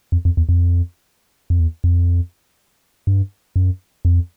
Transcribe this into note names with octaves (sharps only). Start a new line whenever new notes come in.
F2
F2
E2
F2
F2
E2
F2
G2
F#2
F2